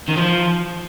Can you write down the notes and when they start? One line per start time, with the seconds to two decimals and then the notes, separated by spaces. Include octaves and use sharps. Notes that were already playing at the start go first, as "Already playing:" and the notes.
0.08 D#3
0.17 F3